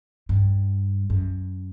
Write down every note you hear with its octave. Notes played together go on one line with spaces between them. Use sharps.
G2
F#2